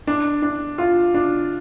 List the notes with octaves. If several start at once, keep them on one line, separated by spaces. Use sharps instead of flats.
D4
D4
F4
D4